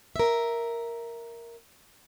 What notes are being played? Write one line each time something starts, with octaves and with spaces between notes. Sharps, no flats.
A#4 E5